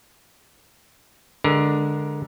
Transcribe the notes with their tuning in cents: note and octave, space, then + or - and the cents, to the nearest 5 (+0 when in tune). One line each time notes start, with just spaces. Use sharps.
D3 +0 G#3 +0 A#4 +20